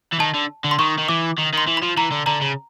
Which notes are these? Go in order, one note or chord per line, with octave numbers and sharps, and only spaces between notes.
E3
D#3 A5
D3
D3
C6
D#3 C#6
D#3
E3 D6
D#3
D#3 C6
E3
B5
F3
E3 A#5
D3
D3 A#5
C#3